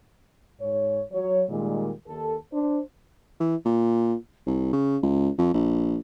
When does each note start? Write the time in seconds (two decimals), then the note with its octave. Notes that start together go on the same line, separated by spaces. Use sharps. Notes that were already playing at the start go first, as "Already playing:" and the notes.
0.60 G#2 C#5
1.12 F#3 C#5
1.49 A#2 D#3 G3 G#3
2.07 D#2 A4
2.53 D4 C5
3.40 E3
3.66 A#2
4.47 C2
4.73 C#3
5.03 C#2
5.38 F2
5.54 A#1